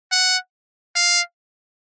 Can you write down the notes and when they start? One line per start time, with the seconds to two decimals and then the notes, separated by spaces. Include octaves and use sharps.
0.12 F#5
0.96 F5